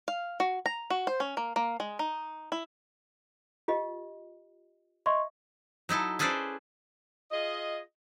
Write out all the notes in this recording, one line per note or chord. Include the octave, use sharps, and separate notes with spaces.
F5
F#4
A#5
F#4
C5
C#4
A#3
A#3
G#3
D#4
E4
F4 G4 D#5
D#5 E5 C6 C#6
F#3 D#4 E4 A4
C#4 G#4 A4 B4 C5 D5
F4 G#4 D#5